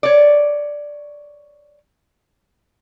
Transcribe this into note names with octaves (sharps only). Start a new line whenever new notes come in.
C#5 D5